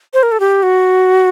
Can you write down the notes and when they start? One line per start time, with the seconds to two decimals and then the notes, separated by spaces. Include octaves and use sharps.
0.14 C5
0.23 A#4
0.32 A4
0.40 G4
0.63 F#4